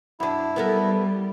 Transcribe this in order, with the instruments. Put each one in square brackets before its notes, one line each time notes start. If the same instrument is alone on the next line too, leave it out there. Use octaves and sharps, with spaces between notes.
[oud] F#2 D4 [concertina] E4
[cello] G3 [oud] B3 A4 A#4